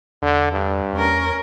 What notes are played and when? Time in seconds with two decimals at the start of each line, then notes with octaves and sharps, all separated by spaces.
0.22 E2 D3
0.52 G2
0.93 E2 C#4 A#4